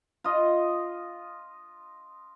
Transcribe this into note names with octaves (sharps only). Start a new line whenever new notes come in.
F4 D#5